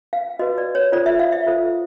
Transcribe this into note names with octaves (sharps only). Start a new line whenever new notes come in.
F5
F#4 B4 D#5
D5
C#5
F4 A4 C5 D5
E5
F5
E5
F4 A4 C5